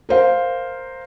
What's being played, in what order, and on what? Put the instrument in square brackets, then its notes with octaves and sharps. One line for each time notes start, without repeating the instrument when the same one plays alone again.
[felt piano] A#4 C5 F5